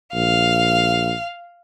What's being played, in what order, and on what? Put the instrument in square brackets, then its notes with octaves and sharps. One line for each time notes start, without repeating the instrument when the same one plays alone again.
[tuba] A#1 [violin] F5